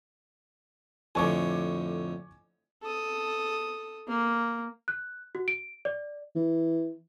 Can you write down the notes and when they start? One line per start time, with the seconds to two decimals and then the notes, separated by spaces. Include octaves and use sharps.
1.15 F2 A2 D3 G#5 C#6 D6
2.83 A4 D#6
4.08 A#3
4.88 F#6
5.35 F#4
5.48 D7
5.85 D5
6.35 E3